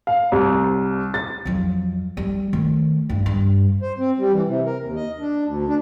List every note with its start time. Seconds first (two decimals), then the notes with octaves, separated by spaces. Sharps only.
0.07 F5
0.32 C2
1.14 A6
1.45 F2 F#3
2.17 G3
2.53 D#3 A3
3.09 G2
3.26 G2
3.81 C5
3.98 C4
4.18 G3
4.32 E3
4.47 C3
4.66 A#4
4.81 D#2
4.96 D#5
5.20 D4
5.45 D2
5.68 D4